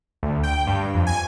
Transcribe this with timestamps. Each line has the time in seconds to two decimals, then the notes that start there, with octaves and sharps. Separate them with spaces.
0.23 D2
0.43 G5
0.67 G2
0.94 F2
1.07 G#5